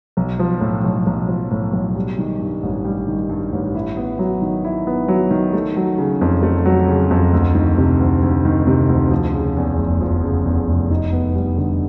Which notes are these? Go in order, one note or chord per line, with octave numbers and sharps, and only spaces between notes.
B1
F3
A2
B1
B1
F3
A2
B1
G3
D#3
G2
A1
G3
D#3
G2
A1
E4
B3
F#3
D#3
E4
B3
F#3
D#3
A3
F#3
C#3
F2
A3
F#3
C#3
F2
D2
D#3
C3
D2
D2
D#3
C3
D2
F3
C#3
E2
F1
F3
C#3
E2
F1
D#4
B3
G3
D3